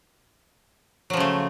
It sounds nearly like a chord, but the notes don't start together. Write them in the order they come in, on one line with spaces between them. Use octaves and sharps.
F#3 F3 C#3 A3